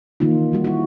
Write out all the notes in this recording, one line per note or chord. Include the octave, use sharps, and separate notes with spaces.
D#3 E3 A#3 D#4 F4
E3 G3 F#4
E4 F#4